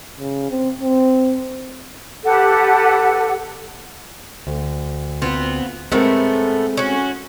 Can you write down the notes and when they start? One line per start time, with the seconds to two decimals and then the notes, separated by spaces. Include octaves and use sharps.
0.19 C#3
0.50 C4
0.81 C4
2.24 G4 A4 B4 F#5
4.47 D2
5.22 B3 C4 F4
5.92 A2 G#3 A3 B3 C4 A#4
6.77 C#4 F#4